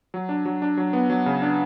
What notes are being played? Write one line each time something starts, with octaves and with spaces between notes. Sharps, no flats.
F#3
D4
F#3
D4
F#3
B3
F#3
C#3
D4